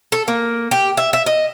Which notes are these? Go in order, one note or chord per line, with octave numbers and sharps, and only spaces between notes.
A4
A#3
G4
E5
E5
D#5